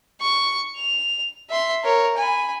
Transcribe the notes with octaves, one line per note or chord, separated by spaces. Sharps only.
C#6
F7
E5 C6
A#4 C#5
G#5 B5